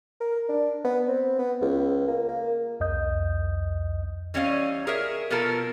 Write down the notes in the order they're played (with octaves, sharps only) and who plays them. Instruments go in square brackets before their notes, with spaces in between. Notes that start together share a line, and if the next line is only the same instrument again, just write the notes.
[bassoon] A#4
D4
B3
C4
B3
C#2
A#3
A#3
[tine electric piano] C2 F2 D#5 D#6 G6
[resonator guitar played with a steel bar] E3 G3 C#4 C#5 D#5 F5
G#4 A#4 C#5 E5
B2 F3 F4 A4 A#4